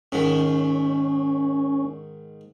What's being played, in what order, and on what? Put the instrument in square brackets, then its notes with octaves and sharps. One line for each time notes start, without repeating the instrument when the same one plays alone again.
[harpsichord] G#2 D#3 [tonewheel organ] C#4